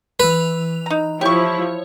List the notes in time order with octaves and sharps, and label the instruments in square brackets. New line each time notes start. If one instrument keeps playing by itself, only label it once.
[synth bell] E3 F7 [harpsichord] B4
[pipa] D#4 A#5
[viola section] F3 E4 [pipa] G4 C#6 [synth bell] C#5